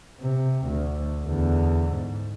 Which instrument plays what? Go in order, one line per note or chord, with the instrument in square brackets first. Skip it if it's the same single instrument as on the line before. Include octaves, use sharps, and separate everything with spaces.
[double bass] C3
D2
E2 D3
G#2